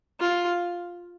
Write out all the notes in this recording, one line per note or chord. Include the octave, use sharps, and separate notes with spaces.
F4